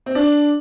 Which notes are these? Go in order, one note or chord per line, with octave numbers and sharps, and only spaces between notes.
C4
D4